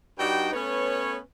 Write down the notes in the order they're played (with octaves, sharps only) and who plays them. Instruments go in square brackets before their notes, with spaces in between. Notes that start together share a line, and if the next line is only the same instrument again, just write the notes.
[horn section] G2 G3 D#4 F#4 G5
A3 B3 C#4 B4 C#5